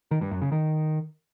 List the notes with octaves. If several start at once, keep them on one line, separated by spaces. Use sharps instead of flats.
D#3
G2
F#2
C#3
D#3